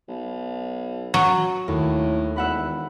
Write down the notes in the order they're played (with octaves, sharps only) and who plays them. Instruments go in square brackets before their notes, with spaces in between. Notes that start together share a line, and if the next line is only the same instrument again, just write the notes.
[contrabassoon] B1
[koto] F#3
[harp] D#2 [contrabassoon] A2
[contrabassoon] E1 [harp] E5 F#5 B5